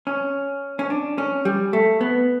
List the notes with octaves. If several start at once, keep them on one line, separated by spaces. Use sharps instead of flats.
C#4
C#4
D4
C#4
G3
A3
B3